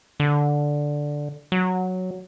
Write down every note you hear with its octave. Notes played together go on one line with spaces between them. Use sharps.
D3
F#3